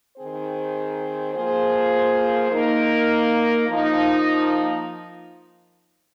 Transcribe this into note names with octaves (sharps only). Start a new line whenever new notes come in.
D#3 C4 G#4 C5
F3 A#3 F4 G#4 C5
A#3 D#4 A#4
F3 A#3 D#4